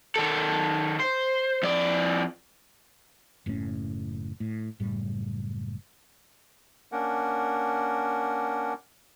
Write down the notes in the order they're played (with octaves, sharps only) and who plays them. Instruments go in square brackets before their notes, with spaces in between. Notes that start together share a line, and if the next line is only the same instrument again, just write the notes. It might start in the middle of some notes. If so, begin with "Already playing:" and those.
[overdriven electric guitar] D#3 A4
C5
F2 D5
[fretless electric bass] F#1 A2 C#3 C#4
A2
F#1 A2 G3
[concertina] A#3 C#4 D4 A#4 F#5